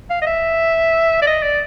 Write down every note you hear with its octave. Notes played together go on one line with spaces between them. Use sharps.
F5
D#5
E5
D5
D#5
D5